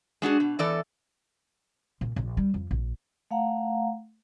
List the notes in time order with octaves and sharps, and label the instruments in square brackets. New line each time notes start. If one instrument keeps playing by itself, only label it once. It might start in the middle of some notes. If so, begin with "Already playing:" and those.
[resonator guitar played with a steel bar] G#3 D4 F#4 G#4
B2
E2 E3 A4 D5
[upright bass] A#2
A#1
G3
F2
A#1
[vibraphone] A3 F5 F#5 A#5